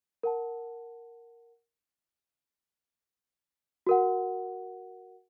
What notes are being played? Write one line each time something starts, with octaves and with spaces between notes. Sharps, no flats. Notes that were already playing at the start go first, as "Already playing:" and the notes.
A#4 F#5 A5
F#4 A#4 F#5